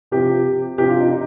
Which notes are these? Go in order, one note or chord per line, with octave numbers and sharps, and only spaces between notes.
C3 F3 G4
C3 F3 G4
F4
D#4
D#4